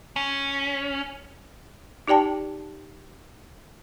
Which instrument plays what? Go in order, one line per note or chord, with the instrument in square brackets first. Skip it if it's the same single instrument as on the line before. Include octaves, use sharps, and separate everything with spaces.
[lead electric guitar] C#4
[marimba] D#4 G4 D5 G5 A5